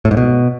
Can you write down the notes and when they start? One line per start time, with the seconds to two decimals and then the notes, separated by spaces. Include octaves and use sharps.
0.05 A2
0.11 G#2
0.17 B2